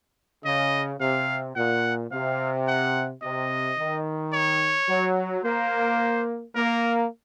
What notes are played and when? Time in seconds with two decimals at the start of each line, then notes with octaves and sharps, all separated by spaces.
0.45 C#3 D#5
1.00 C3 F5
1.55 A#2 F#5
2.11 C3 F5
2.67 F#5
3.22 C3 D#5
3.78 D#3
4.33 C#5
4.89 F#3
5.44 A#3 C5
6.55 A#3 A#4